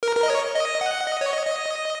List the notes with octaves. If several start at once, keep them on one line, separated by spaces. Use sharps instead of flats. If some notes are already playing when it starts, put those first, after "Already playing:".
A#4
A#4
D#5
C#5
D#5
F#5
D#5
C#5
D#5
D#5